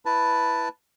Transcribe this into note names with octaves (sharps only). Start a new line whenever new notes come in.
E4 B4 A5